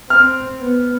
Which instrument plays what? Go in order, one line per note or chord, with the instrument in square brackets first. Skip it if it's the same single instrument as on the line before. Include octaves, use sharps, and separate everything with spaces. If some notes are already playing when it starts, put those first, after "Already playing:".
[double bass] C4 [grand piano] F6
[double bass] B3